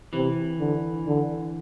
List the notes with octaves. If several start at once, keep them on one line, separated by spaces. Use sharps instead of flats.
C3 E3
D3
D3